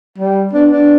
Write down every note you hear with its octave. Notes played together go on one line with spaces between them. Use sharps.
G3
B3 D4
D4